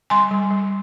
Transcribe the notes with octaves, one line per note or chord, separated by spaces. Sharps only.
G3 G#5 C6
G3
G3